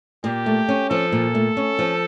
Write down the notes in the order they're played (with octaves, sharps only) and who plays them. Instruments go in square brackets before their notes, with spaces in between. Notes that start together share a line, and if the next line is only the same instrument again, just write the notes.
[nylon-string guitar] A#2 [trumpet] G4
[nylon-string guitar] A3
C#4
[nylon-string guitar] F3 [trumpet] A4
[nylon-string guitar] A#2
A3
C#4
F3